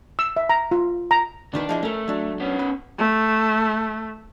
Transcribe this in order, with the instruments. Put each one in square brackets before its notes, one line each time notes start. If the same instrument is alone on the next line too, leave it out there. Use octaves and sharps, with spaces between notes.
[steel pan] E6
E5
A#5
F4
A#5
[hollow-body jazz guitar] D#2 D#3 B4 [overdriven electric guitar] D4
[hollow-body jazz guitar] F3 G#3 E4
[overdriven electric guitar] A3 [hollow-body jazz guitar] C#4 A#4
[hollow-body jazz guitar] F#3 D4
[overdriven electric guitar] B3 C#4
[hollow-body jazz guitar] B4
[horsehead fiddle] A3